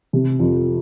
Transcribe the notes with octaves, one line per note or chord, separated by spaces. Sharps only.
C3
F2